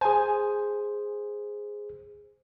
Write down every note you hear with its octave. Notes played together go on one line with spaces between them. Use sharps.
G#4 C5 G#5